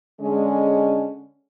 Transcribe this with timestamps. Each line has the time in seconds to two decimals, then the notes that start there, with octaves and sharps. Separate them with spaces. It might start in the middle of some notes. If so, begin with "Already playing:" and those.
0.20 D3 G#3 C#4